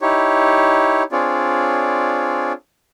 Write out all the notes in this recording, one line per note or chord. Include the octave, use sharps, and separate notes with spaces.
D#4 E4 G4 C#5
C4 D4 F4 G#4 C#5 D5